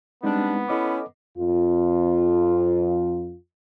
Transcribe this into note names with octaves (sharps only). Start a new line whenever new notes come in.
G3 G#3 B3 C4 D4 D#4
C#4 E4 A4 D#5 D6
F2 F4